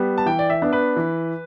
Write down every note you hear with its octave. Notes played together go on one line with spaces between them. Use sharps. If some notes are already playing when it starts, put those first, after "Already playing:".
Already playing: G3 B3
A5
E3 G5
D5
E5
B3 D4
B4
E3